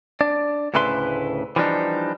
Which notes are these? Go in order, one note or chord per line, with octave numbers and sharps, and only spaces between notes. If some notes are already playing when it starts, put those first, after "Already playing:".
D4 D5
D2 A2 C#3 E4 B4 C6
E3 F3 G3 A#3 D4 D#4